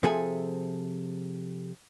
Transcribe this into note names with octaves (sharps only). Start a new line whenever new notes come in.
C3 F3 G#4 A4 E5 G#5